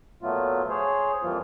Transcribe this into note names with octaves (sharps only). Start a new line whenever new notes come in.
A#2 F#3 A3 B3 F4
G#4 C5 C#5
F2 E3 F3 G3 A#3 F4